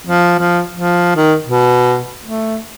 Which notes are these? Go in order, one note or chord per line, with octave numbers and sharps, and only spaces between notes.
F3
F3
F3
D#3
B2
A3